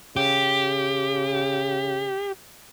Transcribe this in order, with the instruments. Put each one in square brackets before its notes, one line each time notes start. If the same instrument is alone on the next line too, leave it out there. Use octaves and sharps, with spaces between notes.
[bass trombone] C#3 [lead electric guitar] G4